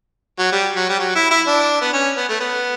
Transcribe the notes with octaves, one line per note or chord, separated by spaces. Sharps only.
F#3
G3
F#3
G3
F#3
E4
E4
D4
B3
C#4
B3
A3
B3